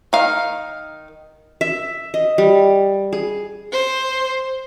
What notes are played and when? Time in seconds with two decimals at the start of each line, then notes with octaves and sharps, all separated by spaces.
0.13 D#3 F5
1.61 E5
2.14 D#5
2.38 G3
3.13 G#4
3.72 C5